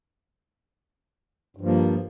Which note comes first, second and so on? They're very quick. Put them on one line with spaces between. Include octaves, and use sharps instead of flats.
G2 F3 A#3